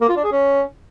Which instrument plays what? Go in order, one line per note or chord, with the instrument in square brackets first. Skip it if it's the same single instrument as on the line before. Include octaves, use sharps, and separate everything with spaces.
[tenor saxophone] A#3
F4
D4
G#4
C#4